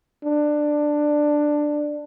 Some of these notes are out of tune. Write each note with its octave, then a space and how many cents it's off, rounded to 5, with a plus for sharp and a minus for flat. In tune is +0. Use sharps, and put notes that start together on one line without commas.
D4 +10